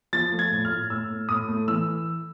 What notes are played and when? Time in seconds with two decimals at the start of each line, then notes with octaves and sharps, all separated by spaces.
0.13 F3 A6
0.32 A3
0.39 G#6
0.52 A2
0.65 F6
0.71 A2
0.90 A2 E6
1.10 A3
1.29 A2 D#6
1.48 A3
1.68 E3 E6